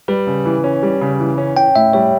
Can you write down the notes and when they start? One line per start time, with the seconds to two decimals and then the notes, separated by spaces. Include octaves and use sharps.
0.08 G3 B4
0.27 C#3
0.45 E3
0.64 C#4
0.83 G3
1.01 C#3
1.20 E3
1.38 C#4
1.56 C#4 G5
1.76 A2 E5
1.93 G3 C#5